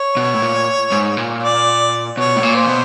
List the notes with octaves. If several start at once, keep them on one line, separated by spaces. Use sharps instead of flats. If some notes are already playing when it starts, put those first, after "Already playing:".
Already playing: C#5
B2
A2
A#2
G#2
A#2
D5
B2 C#5
A2
A#2
C5
B2